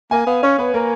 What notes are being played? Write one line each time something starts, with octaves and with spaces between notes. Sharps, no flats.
A#3 G#5
B3 F5
C#4 C#5
B3 B4
A#3 A#4